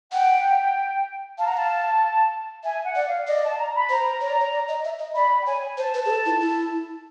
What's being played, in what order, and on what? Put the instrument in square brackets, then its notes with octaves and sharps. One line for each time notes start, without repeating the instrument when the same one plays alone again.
[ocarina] F#5 [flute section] G5
[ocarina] F5 [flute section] A5
[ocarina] F#5 [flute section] A#5
[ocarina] F5 [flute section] A5
[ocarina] E5 [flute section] G#5
[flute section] F#5
[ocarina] D5
[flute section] F5
[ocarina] D5 [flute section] D#5
[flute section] A5
A#5
B5
[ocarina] C5 [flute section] A#5
[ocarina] C#5
D5
C#5
D5
D#5
E5
D#5
[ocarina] D5 [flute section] B5
[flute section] G5
[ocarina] C#5 [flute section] G#5
[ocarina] C5 [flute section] A5
[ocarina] B4
G#4
A4
E4
E4